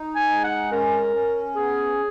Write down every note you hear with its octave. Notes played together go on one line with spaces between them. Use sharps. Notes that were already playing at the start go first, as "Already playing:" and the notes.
Already playing: D#4
G#5
G#3
F#5
C#4 A#4
C#4
B3 G#4